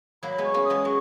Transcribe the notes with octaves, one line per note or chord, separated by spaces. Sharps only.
F#3 A#3 B5
G#3 B3
C#6
A#3 C#4
D#6
G#3 B3
F#3 C#6